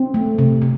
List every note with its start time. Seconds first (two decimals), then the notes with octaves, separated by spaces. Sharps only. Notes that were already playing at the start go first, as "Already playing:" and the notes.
Already playing: C4
0.14 A3
0.38 C3
0.62 C3